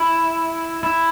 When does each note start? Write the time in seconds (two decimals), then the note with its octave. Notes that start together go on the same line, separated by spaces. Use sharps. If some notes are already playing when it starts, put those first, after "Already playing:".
Already playing: E4
0.83 E4